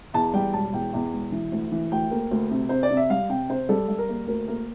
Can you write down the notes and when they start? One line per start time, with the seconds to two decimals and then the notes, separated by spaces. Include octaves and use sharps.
0.14 E2 A5
0.34 G3 G5
0.53 E1 A5
0.73 E2 G5
0.93 E2
1.13 E1
1.32 E3
1.52 D2
1.72 E3
1.92 D2 G5
2.11 A#3
2.31 D2
2.51 C3
2.69 C3 C5
2.83 D5
2.90 C3
2.97 E5
3.10 G3 F5
3.29 C3 G5
3.49 C3 C5
3.69 G3 A4
3.88 G3
3.98 A#4
4.09 A#3
4.28 D2 A#4
4.48 A#3 A#4